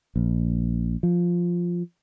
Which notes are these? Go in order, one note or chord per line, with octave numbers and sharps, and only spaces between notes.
A#1
F3